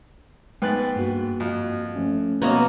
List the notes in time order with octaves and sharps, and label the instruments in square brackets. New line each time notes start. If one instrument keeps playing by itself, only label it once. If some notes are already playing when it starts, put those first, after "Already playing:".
[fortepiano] G#2 B3 F#6 [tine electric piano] G5 A6
[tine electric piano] G2 A#3 F#4
[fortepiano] F2
[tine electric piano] F3 A3 C#4
[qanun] B2 A#3 [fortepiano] B4 C#5 D#5